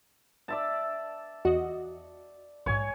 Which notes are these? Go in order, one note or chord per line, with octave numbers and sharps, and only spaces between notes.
D5 E5 A5
E2 F#4 D#5
A#1 G#2 C#5 G#5